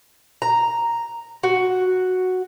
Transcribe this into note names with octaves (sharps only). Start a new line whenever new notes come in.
A#5
F#4